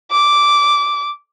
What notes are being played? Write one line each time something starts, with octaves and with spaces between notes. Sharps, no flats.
D6